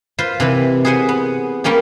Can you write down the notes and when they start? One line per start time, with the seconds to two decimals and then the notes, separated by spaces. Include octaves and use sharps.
0.19 F4 B4 C5
0.40 C3 E3 B4
0.85 G#4 B4 C5 F#5 G#5
1.09 B3
1.64 G3 A#3 C#4 G4